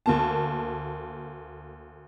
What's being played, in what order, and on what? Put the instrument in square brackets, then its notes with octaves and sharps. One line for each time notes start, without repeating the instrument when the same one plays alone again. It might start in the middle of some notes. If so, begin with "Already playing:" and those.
[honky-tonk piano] D2 A#3 A5